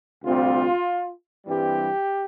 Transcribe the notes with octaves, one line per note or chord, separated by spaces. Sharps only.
D2 C3 G3 C4 F4
G2 E3 G3 C4 G4